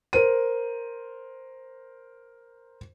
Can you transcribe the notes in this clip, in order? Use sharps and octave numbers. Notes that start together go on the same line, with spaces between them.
A#4 C5 D#7